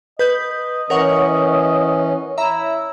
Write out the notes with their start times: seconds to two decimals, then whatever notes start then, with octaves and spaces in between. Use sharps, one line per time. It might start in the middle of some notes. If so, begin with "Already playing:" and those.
0.19 B4 D#5 G6
0.90 E3 C#4 A#4 C#5 F#5 C#6
2.38 E4 E5 A#5